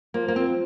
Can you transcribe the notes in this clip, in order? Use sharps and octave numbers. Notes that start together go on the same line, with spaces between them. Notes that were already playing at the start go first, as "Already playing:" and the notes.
F3 A#3
A#3
F3 C4